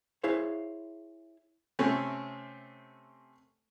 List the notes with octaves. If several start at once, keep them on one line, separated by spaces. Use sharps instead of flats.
E4 G#4 C5 C#5 F5
C3 A3 C4 C#4